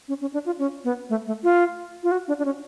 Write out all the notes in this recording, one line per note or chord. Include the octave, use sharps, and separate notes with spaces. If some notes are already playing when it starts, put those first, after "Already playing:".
C#4
C#4
D4
F4
C#4
B3
A3
A3
F4
F4
F#4
D4
D4
C#4